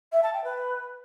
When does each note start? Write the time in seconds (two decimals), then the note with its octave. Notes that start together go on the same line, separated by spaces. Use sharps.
0.12 E5
0.23 A5
0.33 G5
0.44 B4